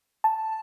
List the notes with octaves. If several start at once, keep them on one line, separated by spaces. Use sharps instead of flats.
A5